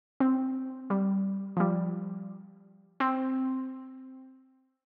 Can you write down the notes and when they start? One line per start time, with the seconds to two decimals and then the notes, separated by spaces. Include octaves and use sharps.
0.20 C4
0.90 G3
1.57 F3
1.60 G3
3.00 C4